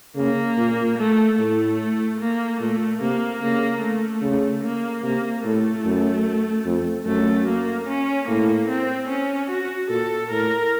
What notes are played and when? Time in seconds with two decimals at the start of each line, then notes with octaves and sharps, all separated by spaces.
0.16 C#3 A#3
0.57 A#2
0.98 A3
1.38 A2 A3
2.20 A#3
2.60 A#2 A3
3.01 C3 A#3
3.41 C#3 A#3
3.82 A3
4.22 C#3
4.63 A#3
5.03 C3 A#3
5.44 A2 A3
5.85 F#2
6.66 F2
7.06 F#2 A3
7.47 A#3
7.87 C#4
8.28 A2 A#3
8.68 C4
9.09 C#4
9.49 F#4
9.89 A#2 A4
10.30 A2 A#4